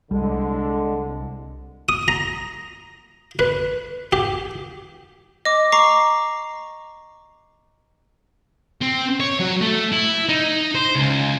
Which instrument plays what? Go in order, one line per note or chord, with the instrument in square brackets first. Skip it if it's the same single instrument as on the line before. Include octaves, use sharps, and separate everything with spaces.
[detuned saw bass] C2 [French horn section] D3 [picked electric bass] G3 [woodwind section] G#3
[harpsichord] D#6
A#5
B4
G4
[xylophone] D#5 D6
A#5 C#6 D6 C7
[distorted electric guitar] C4
C#5
F#3
A3
E4
D#4
C5
C#2